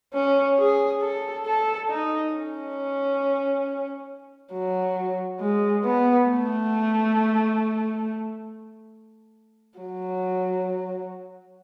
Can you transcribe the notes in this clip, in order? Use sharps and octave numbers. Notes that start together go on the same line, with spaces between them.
C#4
G#4
A4
A4
D#4
C#4
F#3
G#3
B3
A3
F#3